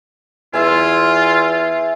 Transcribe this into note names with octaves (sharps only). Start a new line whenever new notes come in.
E2 F4 C5 E5 G#5